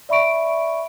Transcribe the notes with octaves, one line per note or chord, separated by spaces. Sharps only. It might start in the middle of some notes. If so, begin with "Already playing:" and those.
D5 E5 B5 C#6 D7